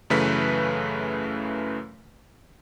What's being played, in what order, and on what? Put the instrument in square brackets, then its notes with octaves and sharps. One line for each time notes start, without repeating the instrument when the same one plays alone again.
[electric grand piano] F#2 C#3 E3 A3 B4 B6